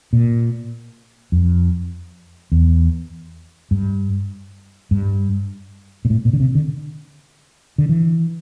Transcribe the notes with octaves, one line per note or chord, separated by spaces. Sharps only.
A#2
F2
E2
G2
G2
A#2
A2
A#2
D3
C3
D3
D3
E3